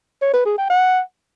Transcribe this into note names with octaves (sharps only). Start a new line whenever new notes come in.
C#5
B4
G#4
G5
F#5